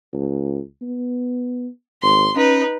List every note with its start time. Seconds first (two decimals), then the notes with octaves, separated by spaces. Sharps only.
0.13 C#2
0.81 B3
2.02 G#1 C6
2.35 C#4 D#4 B4